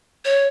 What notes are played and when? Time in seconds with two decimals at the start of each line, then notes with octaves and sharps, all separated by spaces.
0.25 C#5